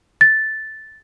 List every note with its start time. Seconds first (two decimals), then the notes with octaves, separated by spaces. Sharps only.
0.21 A6